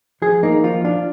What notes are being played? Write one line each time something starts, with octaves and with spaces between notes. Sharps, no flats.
F3 G#4
A#3 D#4
F3 F4
D4 F4